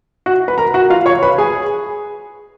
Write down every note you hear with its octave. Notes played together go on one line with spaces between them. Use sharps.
F#4 F#5
B4 B5
A#4 A#5
F#4 F#5
F4 F5
C#5 C#6
B4 B5
G#4 G#5